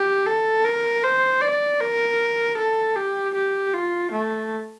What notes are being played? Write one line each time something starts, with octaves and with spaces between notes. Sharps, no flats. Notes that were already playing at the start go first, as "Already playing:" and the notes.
Already playing: G4
A4
A#4
C5
D5
A#4
A4
G4
G4
F4
A3